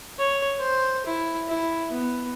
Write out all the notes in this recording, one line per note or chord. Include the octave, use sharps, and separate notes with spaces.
C#5
C5
E4
E4
B3